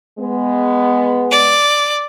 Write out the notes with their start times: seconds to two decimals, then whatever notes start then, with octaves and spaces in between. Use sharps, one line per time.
0.19 G#3 B3
1.31 D5